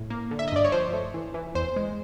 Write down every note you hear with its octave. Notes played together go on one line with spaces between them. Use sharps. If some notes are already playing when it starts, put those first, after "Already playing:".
Already playing: A2
A#3
D3
E5
D#5
G2 D5
C#5
F3 C5
A3
E3
E3
E2 C5
G#3